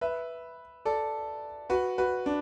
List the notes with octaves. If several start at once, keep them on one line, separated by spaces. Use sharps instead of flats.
B4 E5
A4 D5
F#4 B4
F#4 B4
D4